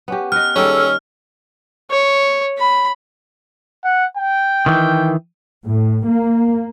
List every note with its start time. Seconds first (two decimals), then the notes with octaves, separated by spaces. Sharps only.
0.08 B3 C#4 G4
0.32 B4 D#5 F6
0.56 D#3 G3 A#3 C#4 G#4 A4 E6
1.91 C#5
2.58 B5
3.84 F#5
4.17 G5
4.66 D#3 E3
5.66 A2
6.08 A#3